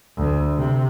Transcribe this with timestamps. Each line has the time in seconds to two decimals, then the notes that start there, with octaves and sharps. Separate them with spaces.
0.17 D2
0.57 C3